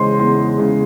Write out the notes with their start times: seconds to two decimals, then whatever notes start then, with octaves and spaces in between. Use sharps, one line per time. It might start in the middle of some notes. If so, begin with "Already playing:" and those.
Already playing: E2 C#3 G#3 C5 C#5 D#5 C6
0.19 E2 C6
0.58 C#3 G#3